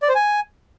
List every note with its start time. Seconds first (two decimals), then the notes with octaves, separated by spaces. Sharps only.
0.02 D5
0.09 C5
0.15 G#5